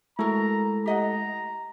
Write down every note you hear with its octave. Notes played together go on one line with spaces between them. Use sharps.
G#3 A3 E4 F#4 A4 A#4 A#5
G4 D#5 F#5 A#5